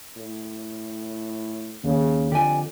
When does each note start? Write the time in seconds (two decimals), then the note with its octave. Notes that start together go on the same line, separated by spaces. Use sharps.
0.17 A2
1.84 D#2 C#3
2.32 F2 D3 G4 D5 G#5